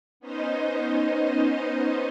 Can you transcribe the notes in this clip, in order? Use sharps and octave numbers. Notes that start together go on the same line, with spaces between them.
B3 C#4 D#4 C5 D#5